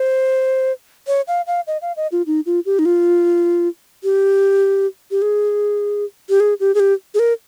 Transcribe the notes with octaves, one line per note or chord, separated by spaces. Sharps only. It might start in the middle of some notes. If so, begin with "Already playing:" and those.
Already playing: C5
C#5
F5
F5
D#5
F5
D#5
F4
D#4
F4
G4
D#4
F4
G4
G4
G#4
G4
G#4
G4
G#4
G4
G#4
A#4